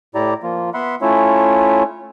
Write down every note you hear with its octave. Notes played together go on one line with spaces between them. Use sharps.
A2 E4 G4 D5 A#5
F3 A#3 F4
B3 E5 F#5 B5 C6
A3 C#4 E4 F4 C#5 E5